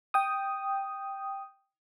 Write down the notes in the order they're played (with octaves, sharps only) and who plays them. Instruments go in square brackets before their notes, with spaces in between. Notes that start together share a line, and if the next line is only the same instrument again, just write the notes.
[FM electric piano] G5 D#6